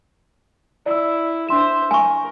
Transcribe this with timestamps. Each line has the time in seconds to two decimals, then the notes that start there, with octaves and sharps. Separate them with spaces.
0.86 E4 D5 E6
1.49 D4 C5 E5 C6 E7
1.91 A#4 G#5 C#6